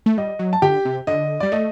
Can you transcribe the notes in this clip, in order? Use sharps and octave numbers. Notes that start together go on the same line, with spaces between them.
A3
G3 D#5
F#3
A5
D3 G4 G5
C3
D3 D#5
G3 D5
A3 D#5